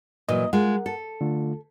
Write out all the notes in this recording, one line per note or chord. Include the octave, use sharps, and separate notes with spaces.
A#2 E3 F#3 D#5 D#6
G#3 F4 A#4 F#5
A4
D3 A3 F4